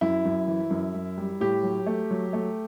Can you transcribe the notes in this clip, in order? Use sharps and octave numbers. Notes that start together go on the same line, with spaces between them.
F#2 E4
F#2
E3
F#2
F#2
G3
A2 G4
F#3
A3
F#3
A3